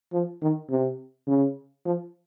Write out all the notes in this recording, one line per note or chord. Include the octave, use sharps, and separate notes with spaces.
F3
D#3
C3
C#3
F3